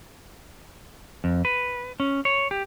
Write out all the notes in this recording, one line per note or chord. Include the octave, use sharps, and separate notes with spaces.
F2
B4
C#4
C#5
G4